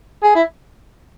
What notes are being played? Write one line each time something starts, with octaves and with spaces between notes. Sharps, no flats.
G#4
E4